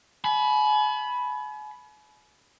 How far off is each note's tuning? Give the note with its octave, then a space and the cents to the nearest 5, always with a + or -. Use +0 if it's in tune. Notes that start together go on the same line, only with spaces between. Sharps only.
G#5 +40 B5 +0